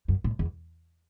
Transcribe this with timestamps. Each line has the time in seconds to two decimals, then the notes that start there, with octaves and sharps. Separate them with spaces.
0.08 F#2
0.24 A2
0.39 E2